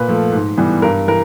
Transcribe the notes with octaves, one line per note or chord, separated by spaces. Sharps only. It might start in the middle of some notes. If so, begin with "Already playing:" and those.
Already playing: A#2 B4
F3 A3
G#2
E3 G3 B3
G2 A#4
E3 A#4